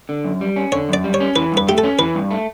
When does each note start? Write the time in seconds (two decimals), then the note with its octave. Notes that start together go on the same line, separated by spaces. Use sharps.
0.09 D3
0.25 F#2
0.41 G3
0.56 C#4
0.72 D3 C#5
0.89 F#2 D5
1.04 G3
1.14 C#5
1.20 C#4
1.36 E3 B4
1.52 G2
1.57 B4
1.67 A3 G4
1.78 A4
1.83 C#4
1.99 E3 B4
2.15 G2
2.31 A3